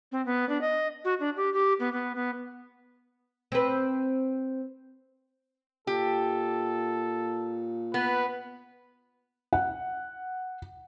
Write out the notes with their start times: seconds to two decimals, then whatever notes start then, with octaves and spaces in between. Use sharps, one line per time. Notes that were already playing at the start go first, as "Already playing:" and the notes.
0.12 C4
0.26 B3
0.49 D4
0.61 D#5
1.05 F#4
1.20 D4
1.37 G4
1.54 G4
1.80 B3
1.93 B3
2.15 B3
3.52 C4 B4
5.87 A#2 G4 A4
7.94 B3 B4
9.53 F#5